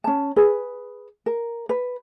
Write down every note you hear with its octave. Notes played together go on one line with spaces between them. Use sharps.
C#4 A5
G#4 B4
A#4
B4